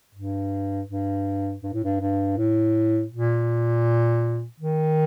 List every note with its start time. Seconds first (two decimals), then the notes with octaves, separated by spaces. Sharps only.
0.15 G2
0.89 G2
1.63 G2
1.73 A2
1.84 G2
2.00 G2
2.37 A2
3.12 A#2
4.60 D#3